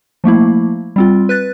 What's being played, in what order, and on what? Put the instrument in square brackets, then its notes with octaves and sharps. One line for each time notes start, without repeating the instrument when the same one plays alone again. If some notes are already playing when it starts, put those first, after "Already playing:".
[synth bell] F3 A3 A#3 E4
G3 C4 F4
B4 F#6 A6